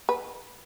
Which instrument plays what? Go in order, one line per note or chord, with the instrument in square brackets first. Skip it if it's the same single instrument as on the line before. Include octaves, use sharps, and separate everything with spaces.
[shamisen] B4